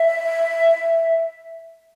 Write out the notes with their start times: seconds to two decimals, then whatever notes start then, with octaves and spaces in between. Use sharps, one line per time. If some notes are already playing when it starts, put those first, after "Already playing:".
Already playing: E5